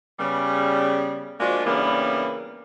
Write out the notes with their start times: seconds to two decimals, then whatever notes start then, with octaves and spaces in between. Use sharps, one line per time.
0.20 C#3 G3 B3
1.40 F3 G#3 A#3 D4 F4 F#4
1.65 C#3 E3 G3 A#3 B3 D4